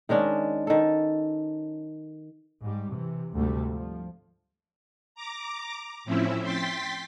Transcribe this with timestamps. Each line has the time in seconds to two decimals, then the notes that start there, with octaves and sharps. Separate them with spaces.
0.09 D#3 G#3 C#4 D4
0.67 D#3 A4
2.61 G#2 G3
2.92 C3 E3
3.34 D2 G#2 C3 G3 A3
3.72 F3
5.15 A#5 D6
6.04 A2 F3 C4 C#4 E4 E5
6.42 G5 C6 A6 B6